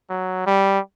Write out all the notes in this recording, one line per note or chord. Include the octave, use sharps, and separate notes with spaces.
F#3
G3